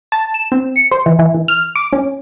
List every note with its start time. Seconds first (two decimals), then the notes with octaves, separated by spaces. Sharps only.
0.12 A5
0.34 E7
0.52 C4
0.76 C#7
0.91 C5
1.06 E3
1.19 E3
1.34 E3
1.48 F6
1.76 D6
1.93 C#4